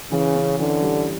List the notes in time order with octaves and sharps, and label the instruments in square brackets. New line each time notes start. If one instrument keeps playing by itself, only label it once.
[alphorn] C#3 [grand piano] E3
[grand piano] C#4
[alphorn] D3 [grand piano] E3
[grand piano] G3